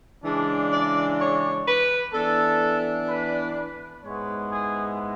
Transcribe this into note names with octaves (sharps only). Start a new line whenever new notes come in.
C#3 E3 G#3 D4
D5
C#5
B4
E3 B3 D4 A4
B4
B4
G#2 G#3 B3 E4 C#5
G#4